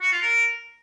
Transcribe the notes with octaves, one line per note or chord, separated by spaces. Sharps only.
F#4
F4
A#4